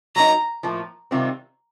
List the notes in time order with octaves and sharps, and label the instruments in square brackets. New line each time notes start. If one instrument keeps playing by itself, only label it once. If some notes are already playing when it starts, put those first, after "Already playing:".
[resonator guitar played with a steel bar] F#3 A#3 D#4 [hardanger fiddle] A#5
[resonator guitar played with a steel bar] A2 F3 A#3
C3 D#3 G3 C4 F4